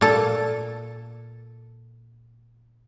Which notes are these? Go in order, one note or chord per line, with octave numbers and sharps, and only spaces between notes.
A#2 A4